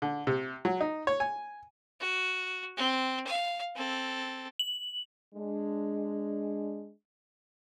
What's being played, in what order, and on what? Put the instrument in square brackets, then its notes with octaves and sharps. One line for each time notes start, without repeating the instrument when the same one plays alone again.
[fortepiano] D3
C3
F#3
D#4
C#5
G#5
[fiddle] F#4
C4
F5
C4 A4
[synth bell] F#7
[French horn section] G#3 D4